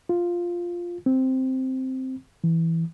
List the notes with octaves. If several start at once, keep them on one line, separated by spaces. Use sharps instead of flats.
F4
C4
E3